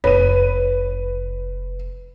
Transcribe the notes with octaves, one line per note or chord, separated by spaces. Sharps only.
F1 B4 C#5 D#7